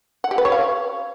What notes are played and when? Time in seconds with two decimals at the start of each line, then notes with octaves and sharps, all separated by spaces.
0.24 F#5
0.31 G4
0.38 B4
0.45 C#5
0.52 F5